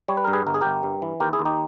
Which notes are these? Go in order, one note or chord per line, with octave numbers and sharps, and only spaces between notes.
G3 C#5
B4
G2 A#4
G#4 B4
G1 A#4
G#4
G1 G4 A#4
G2
E3
D#2 G4 A#4
E4 G#4
D#2
D#4 G4